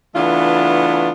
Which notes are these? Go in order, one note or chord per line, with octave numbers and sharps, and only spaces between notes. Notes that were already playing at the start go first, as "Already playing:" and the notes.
C#3 E3 A3 B3 D4 F4